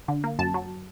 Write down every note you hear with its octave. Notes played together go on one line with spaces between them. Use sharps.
D3
A#3
F#2 A5
F#3